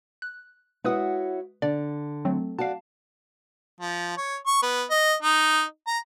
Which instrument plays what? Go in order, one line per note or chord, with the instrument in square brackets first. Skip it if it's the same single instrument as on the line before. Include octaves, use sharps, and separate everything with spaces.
[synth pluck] F#6
[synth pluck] G#3 B4 D#6 [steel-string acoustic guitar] E4 F#4 C#5
[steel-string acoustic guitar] D3 [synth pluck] D5
[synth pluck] F#3 A3 C4
[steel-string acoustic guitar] F#4 D5 [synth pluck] F5 A5
[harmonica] F3
C#5
C#6
B3
D#5
D#4
A#5